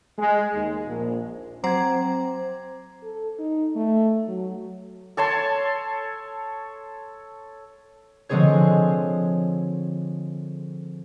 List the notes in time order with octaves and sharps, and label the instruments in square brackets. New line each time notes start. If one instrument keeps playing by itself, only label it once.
[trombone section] G#3
D#2
A#1
[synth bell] F#3 C5 D6 [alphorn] C4 [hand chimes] A#5 G#6
[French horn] A4
D#4
A3
F#3
[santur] A4 C#5 A5 C6
[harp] D3 F3 G#3 C4 G#4 C#5